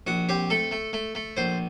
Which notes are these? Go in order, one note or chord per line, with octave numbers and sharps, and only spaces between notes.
A#1 F#4
C4 G4
A3 A4
A3
A3
A3
A#1 C5